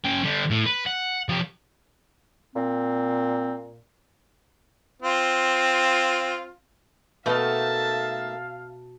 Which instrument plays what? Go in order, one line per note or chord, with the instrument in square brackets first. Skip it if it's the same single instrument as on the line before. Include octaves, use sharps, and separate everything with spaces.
[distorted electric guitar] C#4 G5
D3 G3
A2
B4
F#5
F3 G4
[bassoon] A#2 [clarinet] C4
[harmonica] C4 F4
[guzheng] B2 [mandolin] A3 A#3 D#4 [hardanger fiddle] E5 A5 [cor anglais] F5